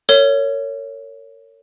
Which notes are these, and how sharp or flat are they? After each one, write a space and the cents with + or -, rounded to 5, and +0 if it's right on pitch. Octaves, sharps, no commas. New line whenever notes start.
A#4 -35 C#5 +10